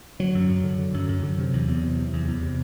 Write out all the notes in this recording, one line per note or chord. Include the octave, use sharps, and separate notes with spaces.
D3 F#3
F#2
F#2
D3
D3
F#2
F#2
D3
C3
E2
E2
C3
C3
E2
E2
C3